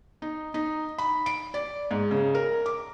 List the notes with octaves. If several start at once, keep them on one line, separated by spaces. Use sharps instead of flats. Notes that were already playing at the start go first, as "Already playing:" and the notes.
D#4
D#4
B5
D7
D5
G#2
C#3
A#4
D6